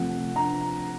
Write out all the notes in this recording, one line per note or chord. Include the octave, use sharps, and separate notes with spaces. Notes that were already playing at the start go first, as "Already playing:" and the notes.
Already playing: C3 F3 A3 C4 F#5
A#5